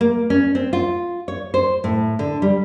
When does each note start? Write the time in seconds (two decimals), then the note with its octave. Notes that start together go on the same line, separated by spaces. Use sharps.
0.01 A#3
0.30 C#4
0.55 C4
0.73 F4
1.28 C#5
1.54 C5
1.84 A2
2.19 D3
2.42 G3